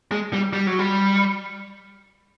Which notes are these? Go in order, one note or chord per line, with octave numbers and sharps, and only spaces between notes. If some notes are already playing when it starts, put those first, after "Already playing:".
G#3
G3
G3
F#3
G3